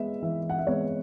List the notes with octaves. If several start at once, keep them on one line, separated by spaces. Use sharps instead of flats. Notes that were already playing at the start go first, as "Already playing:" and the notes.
Already playing: G#3 B3 E5
E3 E5
F#5
E5
G#3 B3 C#5